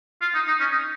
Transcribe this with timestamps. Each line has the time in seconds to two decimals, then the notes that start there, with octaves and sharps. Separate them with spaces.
0.21 F4
0.35 D#4
0.47 D#4
0.60 C#4
0.72 D#4